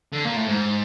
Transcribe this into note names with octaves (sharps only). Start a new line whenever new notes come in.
D3
A#2
A2
G#2